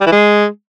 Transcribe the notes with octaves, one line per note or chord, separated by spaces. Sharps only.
G3
E3
G#3